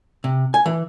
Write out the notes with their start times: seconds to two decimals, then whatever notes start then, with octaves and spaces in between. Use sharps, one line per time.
0.24 C3
0.54 G#5
0.66 E3